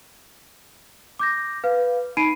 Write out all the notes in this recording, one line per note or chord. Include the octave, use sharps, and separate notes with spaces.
D6 G6 A#6
B4 F5
D#4 B5 C7 D7 D#7